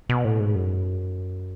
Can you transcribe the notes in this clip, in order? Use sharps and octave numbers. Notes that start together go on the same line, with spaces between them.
B2
A2
G#2
F#2